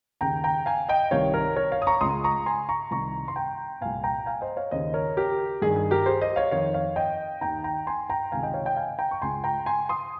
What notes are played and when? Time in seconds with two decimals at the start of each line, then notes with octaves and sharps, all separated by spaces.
0.21 D#2 C#3 G5 A#5
0.44 G5 A#5
0.66 F5 G#5
0.89 D#5 G5
1.11 C2 C3 D#3 C#5 F5
1.34 A#4 C#5
1.56 A#4 C#5
1.72 C#5 F5
1.82 D#6
1.87 A#5 C#6
2.01 C#2 C#3 C6 D#6
2.24 A#5 C#6
2.46 G#5 C6
2.69 A#5 C#6
2.91 C2 C3 D#3 A#5 C#6
3.28 C6
3.36 G5 A#5
3.81 C2 A#2 F5 G#5
4.04 G5 A#5
4.26 F5 G#5
4.41 C5 D#5
4.57 C#5 F5
4.71 D#2 C#3 C5 D#5
4.94 A#4 C#5
5.17 G4 A#4
5.62 G2 D#3 G#4
5.76 G#4
5.91 G4 A#4
6.06 G#4 C5
6.21 C5 D#5
6.36 C#5 F5
6.51 F2 D#3 C#5 F5
6.74 C#5 F5
6.96 D#5 G5
7.41 D#2 D#3 G5 A#5
7.64 G5 A#5
7.87 G#5 C6
8.10 G5 A#5
8.32 C#2 C3 D#3 F5 G#5
8.43 D#5 G5
8.54 C#5 F5
8.66 D#5 G5
8.77 F5 G#5
8.99 G5 A#5
9.11 C#6
9.22 C#2 C#3 G#5 C6
9.44 G5 A#5
9.66 G#5 C6
9.89 C6 D#6